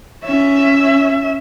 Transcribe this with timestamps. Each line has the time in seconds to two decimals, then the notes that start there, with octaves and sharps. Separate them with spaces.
0.24 C#4 E5